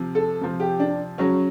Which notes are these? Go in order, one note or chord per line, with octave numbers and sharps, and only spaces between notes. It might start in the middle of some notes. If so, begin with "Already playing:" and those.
Already playing: C3 F3
A4
C3 F3
G4
D4
C#3 F#3 C#4